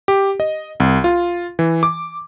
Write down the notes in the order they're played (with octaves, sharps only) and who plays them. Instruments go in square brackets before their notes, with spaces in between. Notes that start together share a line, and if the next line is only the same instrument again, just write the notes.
[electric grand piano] G4
D#5
C2
F4
E3
D6